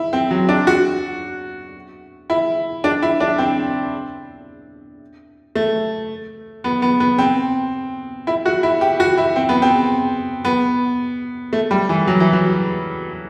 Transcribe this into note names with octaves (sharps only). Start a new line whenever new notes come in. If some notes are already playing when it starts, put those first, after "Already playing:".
Already playing: E4
C4
F#3
D4
F#4
E4
D4
E4
D4
C4
A3
B3
B3
B3
C4
E4
F#4
E4
G4
F#4
E4
C4
B3
C4
B3
A3
G3
E3
F#3
E3
F#3